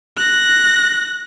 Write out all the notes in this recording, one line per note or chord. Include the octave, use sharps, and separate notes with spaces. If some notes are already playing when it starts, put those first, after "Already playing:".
F#6 A#6